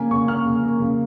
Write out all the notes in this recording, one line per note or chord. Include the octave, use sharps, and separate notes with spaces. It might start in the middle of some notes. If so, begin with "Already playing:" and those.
Already playing: C#3 A#3 G#5
C#3 C#6
A#3 F6
C#3
A#3
C#3